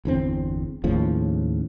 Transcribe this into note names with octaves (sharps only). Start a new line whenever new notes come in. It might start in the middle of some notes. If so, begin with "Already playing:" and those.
G1 E2 C4
D#2 A2 C#3 F3